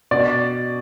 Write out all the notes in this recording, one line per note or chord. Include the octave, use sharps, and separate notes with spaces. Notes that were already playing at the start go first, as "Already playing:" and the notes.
B2 D5